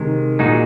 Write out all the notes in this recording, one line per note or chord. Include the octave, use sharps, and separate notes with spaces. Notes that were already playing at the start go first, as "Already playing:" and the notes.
Already playing: C3 D#3 G#3
A#2 G#3 D#4 F#4